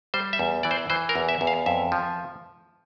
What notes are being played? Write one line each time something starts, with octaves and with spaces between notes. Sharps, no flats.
G3 C5
E5
E2
E3 D5
C5
E3 C5
A#4
E2
E5
E2
F5
F2 E5
F3